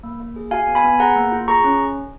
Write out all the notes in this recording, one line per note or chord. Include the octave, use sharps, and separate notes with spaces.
A#3
A#3
G#4
F#4 F5 G#5
B3
G#5 B5
B3
G#4 F#5 A#5
A#3
F4
G#4 A#5 C#6
C#4